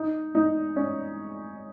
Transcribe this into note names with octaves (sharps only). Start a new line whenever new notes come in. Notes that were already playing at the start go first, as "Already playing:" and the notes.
Already playing: D#4
D#4
C#4